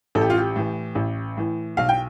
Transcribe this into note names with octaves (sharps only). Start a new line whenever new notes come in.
A1 A4
G4
F4
G4
A2 E3
A1
A2 E3
B1 F5
G5